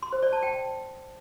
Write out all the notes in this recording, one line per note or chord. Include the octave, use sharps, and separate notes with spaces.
C6
C5
D5
A5
G5